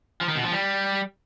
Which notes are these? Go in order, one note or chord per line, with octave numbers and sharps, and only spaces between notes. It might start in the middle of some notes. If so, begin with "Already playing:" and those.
F3
D#3
B2
F3
G3